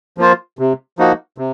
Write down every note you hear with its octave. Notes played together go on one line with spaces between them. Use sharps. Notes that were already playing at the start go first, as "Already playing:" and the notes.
F3 A#3 F4 C5
C3
F3 A#3 D#4 F#4
C3